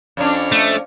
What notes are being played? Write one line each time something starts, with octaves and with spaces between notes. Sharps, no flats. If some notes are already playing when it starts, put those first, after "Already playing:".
F2 C#4 D4
A3